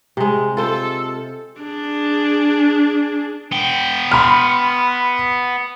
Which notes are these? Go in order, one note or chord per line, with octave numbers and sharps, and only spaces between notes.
C3 G#3
F4 A4 C5
D4 G#4
B3 G5
B5 C6 F6